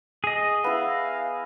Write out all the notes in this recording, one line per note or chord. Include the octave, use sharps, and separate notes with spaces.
G#4 D#5
B3 E4 F5